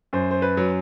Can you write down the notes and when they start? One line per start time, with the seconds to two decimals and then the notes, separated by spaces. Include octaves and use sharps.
0.13 F#2 C5
0.31 C5
0.42 B4
0.57 F#3